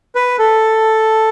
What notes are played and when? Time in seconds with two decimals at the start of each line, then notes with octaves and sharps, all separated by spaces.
0.15 B4
0.39 A4